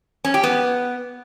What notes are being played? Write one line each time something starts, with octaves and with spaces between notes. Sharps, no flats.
C#4
G4
B3